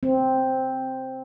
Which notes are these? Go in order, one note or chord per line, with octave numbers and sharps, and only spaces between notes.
C4